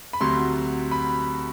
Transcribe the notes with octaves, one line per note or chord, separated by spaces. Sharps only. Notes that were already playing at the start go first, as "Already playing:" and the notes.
B5
D2 C3 F#3 C6
B5